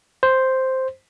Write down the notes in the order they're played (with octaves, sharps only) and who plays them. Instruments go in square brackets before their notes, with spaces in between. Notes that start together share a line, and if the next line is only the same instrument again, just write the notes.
[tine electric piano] C5